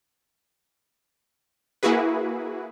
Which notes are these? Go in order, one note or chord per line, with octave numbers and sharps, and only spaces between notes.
A#3 E4 F#4 G#4 B4